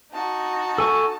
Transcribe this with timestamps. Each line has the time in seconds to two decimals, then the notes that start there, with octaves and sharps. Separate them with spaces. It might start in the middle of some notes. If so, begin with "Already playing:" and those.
0.12 D#4 F#4 A5
0.78 A4 G#5 C#6